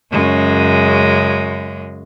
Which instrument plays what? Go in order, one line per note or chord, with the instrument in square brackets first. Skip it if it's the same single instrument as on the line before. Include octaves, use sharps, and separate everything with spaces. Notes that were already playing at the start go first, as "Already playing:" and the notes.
[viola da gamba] F#2 C#3 G#3